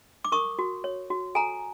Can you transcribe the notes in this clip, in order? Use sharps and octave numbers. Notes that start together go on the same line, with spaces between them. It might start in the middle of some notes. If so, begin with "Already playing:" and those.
D6
A#4 C#6 D#6
F#4
C#5
F#4
A4 G#5 A#5